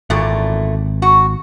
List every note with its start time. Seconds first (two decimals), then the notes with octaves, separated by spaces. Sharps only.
0.10 G#1 E2 A#2 A3
1.02 F#4